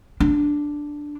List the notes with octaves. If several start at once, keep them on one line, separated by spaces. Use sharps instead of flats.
D4